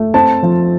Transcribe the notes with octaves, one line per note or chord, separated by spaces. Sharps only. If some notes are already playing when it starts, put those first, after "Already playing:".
Already playing: A3
C4 A5
F3